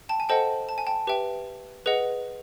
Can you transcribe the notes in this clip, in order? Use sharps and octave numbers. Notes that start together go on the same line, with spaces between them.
G5 A5
G#5
A4 C5 D#5 F#5 G5 A5
A5
G#5
G5 A5
G4 B4 E5 G5
G#4 B4 D#5 F#5